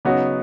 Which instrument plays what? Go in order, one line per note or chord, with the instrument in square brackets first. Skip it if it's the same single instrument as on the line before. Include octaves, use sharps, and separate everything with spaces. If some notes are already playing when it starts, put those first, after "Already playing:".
[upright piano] C#3 F#3 B3 D#4 F#4